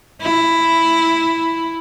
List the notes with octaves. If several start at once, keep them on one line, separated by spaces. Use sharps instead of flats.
E4